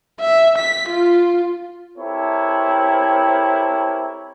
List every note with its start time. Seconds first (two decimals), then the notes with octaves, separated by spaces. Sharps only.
0.20 E5
0.58 B6
0.89 F4
1.98 C4 E4 G4 A4 A#4 C#5